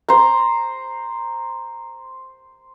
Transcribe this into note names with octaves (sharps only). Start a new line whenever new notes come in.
C5 A#5